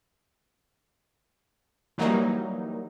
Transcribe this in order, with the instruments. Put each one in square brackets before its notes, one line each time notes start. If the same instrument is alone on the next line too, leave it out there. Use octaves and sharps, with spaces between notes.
[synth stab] E3 F#3 G3 A#3 D#4